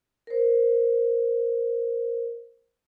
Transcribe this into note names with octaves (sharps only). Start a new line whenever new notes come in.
A#4 C5